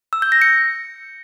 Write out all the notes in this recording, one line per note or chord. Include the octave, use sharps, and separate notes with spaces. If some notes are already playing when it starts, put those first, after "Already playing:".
E6
G6
A#6
C#7